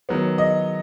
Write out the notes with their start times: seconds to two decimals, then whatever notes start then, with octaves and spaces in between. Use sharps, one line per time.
0.09 D#3 F#3 B3
0.38 D#5